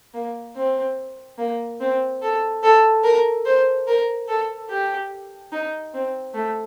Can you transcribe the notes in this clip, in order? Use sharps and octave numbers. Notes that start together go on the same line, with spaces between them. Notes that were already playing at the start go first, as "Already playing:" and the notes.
A#3
C4
A#3
C4
A4
A4
A#4
C5
A#4
A4
G4
D#4
C4
A3